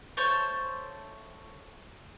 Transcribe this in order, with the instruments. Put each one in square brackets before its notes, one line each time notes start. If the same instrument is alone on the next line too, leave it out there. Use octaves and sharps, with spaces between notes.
[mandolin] A3 C5 C#5 A5